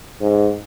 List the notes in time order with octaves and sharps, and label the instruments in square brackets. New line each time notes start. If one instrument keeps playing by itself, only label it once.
[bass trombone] G#2